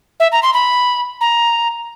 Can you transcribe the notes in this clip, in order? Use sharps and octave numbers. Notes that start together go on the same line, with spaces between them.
E5
A#5
C6
B5
A#5